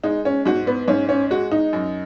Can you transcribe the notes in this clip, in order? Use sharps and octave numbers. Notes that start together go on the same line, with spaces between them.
G#3 D#4
C#4
G#2 F#4
B3
G#2 C#4
C#4
G#3 F#4
D#4
F#2